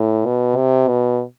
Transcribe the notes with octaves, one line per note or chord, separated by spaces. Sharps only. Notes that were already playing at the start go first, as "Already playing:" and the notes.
Already playing: A2
B2
C3
B2